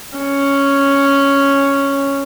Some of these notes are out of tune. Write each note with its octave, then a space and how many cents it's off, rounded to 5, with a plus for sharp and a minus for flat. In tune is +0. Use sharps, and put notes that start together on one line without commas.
C#4 +0